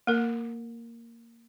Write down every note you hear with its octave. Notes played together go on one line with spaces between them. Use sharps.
A#3 A#4